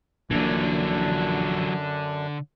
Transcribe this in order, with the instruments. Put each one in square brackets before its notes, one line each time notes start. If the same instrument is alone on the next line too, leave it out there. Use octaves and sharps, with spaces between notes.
[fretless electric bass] A#1 A#2 [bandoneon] F#2 D4 [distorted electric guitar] D3 [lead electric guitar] E3 F#3